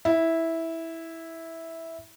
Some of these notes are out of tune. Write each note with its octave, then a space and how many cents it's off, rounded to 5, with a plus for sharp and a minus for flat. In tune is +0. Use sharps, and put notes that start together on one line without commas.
E4 -10